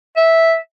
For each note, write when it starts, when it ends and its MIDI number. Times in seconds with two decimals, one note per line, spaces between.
0.17 0.56 76